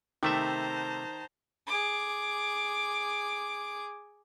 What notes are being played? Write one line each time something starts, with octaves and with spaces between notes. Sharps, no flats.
C3 D#3 A3 C5 E5 A5 A#5
G#4 D6